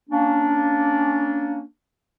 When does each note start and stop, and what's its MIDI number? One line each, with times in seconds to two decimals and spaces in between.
0.10 1.61 58
0.10 1.61 61
0.10 1.61 62